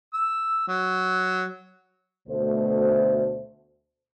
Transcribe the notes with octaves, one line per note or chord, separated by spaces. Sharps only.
E6
F#3
D2 B2 A3 A4 C5